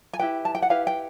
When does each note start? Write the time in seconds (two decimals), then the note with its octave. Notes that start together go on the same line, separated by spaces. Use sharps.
0.13 G#5
0.19 E4 G4 B4 G5
0.45 A5
0.55 G5
0.62 F#5
0.70 E4 G4 B4 F5
0.87 G5